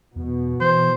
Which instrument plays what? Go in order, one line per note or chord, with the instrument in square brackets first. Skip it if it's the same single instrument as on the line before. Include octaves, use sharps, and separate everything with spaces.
[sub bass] E2 [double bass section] B2
[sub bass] E3 [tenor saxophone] C5